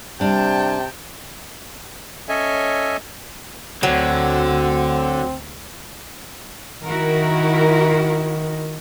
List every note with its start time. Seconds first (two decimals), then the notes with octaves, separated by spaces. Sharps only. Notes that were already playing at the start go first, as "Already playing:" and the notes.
0.21 C3 G3 D4 G5 A5
2.29 C#4 A4 C#5 D#5 E5 G#5
3.83 D2 D3 F#3 C4
6.84 D#3 E4 F#4 A#4